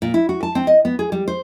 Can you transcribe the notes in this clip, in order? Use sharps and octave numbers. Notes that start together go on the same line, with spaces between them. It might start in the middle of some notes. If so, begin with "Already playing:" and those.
A#2
E4
F#4
A5
C4
D#5
B3
G#4
G3
C5